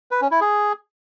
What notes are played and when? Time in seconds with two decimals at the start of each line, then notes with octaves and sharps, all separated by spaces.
0.11 B4
0.21 C#4
0.31 E4
0.41 G#4